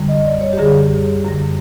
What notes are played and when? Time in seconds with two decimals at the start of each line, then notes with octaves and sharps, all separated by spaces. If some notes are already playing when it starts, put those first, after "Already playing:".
Already playing: F#2 D3 G3
0.08 D#5
0.26 D5
0.41 C#5
0.53 G4
0.58 F#2 D3 G3 G#4
1.25 F#2 D3 G3